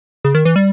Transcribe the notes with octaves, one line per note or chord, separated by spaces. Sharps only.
C#3
D#3
E3
G3